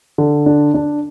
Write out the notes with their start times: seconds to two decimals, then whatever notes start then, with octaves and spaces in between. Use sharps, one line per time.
0.18 D3
0.46 D4
0.74 D4